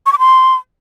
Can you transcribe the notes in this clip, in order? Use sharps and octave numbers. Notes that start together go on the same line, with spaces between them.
C#6
D6
C6